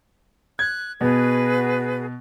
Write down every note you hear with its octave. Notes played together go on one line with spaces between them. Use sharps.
F#6 G#6
B2 F#4 G#4 B4